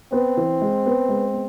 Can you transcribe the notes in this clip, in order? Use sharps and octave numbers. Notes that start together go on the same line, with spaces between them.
B3 C4
E3
G#3
B3
G#3
B3